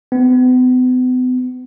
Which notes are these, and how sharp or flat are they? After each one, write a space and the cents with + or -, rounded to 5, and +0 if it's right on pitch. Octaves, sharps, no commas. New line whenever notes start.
B3 +40